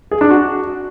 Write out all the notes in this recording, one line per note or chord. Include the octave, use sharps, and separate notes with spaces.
G#4
D4
F#4